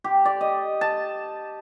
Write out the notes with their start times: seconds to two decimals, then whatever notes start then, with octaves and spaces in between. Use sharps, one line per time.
0.04 G4
0.25 D5
0.41 D#5
0.81 A5